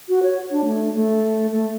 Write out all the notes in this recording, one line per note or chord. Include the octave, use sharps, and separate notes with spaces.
F#4
C#5
D4
A3
A3
A3